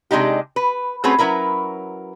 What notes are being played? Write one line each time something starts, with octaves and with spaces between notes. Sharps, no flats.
C3 G#3 D4 D#4 G4
B4
A3 C4 C#4 F#4 G#4 B4
F#3 C#4 E4 A#4 B4